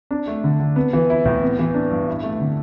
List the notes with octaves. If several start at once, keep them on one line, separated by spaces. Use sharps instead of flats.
D4
A3
D3
D3
B3
E3
E4
A2
B3
E3
D4
G2
E4
A3
D3